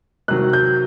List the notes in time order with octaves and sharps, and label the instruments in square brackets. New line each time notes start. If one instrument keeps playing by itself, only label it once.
[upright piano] C3 D#3 F#3 F#6
G6